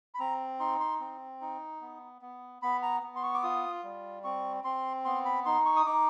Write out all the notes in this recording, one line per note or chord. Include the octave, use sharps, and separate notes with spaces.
B5
C4 A#5
D#4 C6
C6
C4
D#4
B3
B3
B3 B5
A#5
B3
C6
C#6
D6
F4 D#6
G3
C4 C#6
C4 C6
B3 C6
B5
D#4 C6
C#6
D#6
D#4 D6